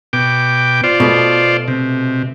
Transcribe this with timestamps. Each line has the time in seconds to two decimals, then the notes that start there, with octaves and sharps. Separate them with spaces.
0.13 B2 G5 D6
0.84 F4 C5 D5
1.00 B2 A3
1.68 C3